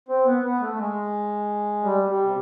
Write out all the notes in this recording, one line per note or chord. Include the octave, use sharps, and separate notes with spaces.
C4
B3
B3
A3
G#3
G3
G3
C3